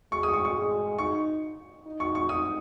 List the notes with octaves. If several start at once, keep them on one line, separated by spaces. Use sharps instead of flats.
G#3 C#6
D#6
C#6
C#6
G#3
D#4 C#6
D#4
C#6
C#6
D#4 D#6